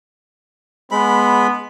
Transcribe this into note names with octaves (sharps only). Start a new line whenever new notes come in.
G#3 B3 B5